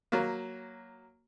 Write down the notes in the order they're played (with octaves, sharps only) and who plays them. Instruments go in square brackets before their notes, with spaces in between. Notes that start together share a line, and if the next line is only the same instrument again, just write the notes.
[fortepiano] F#3 A#3